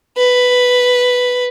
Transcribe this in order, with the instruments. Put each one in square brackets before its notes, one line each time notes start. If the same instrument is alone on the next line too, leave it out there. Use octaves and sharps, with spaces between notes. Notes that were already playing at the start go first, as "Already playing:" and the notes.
[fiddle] B4